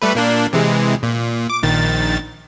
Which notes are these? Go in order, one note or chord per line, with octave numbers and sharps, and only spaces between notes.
G3 A3 B4
A#2 A#3 D4
C3 E3 G#3
A#2
D6
A#1 D#3 A6